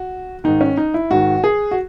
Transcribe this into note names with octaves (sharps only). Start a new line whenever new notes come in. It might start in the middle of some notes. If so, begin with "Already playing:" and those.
Already playing: F#4
G#2 D#3 D#4
C#4
D#4
E4
G#2 D#3 F#4
G#4
F#4